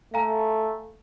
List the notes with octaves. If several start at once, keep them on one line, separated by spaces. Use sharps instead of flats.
A3 F5 G#5 A#5